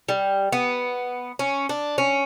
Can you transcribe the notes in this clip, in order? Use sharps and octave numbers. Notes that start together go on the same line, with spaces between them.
G3
B3
C#4
D4
C#4